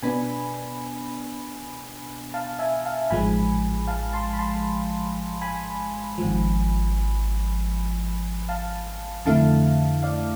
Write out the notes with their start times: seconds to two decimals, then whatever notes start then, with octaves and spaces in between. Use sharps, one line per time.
0.03 B2 B3 D4 G#5 B5
2.34 F5 A5
2.59 E5 G#5
2.85 F5 A5
3.10 A1 G#2 F3 G#3 G#5 B5
3.87 F5 A5
4.13 A5 C6
4.33 B5
4.39 A5 C6
5.42 G#5 B5
6.18 G#1 G#2 F3
8.49 F5 A5
9.26 F2 D3 A3 E4 F5 A5
10.03 D5 F5